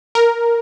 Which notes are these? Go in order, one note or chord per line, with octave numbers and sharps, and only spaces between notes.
A#4